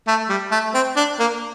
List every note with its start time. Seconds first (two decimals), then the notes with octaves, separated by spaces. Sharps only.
0.08 A3
0.29 G3
0.52 A3
0.74 C4
0.96 D4
1.19 A#3